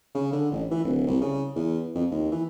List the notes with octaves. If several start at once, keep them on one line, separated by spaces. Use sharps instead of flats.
C#3
D3
A1
E3
D1
C2
C#3
E2
F2
D#2
E3